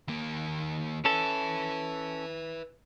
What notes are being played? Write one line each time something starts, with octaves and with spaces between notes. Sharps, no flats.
D#2 A#3
C#4 A4 B4 E5